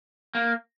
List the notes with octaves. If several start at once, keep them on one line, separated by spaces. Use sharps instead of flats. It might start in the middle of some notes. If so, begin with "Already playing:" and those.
A#3